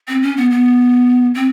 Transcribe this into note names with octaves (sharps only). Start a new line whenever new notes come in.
C4
C#4
B3
B3
C4